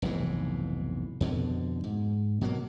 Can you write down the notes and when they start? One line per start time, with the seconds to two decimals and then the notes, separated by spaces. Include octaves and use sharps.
0.02 F1 B1 G#2 E3
1.21 F2 B2 D3
1.84 G#2
2.41 B2 F#3 A#3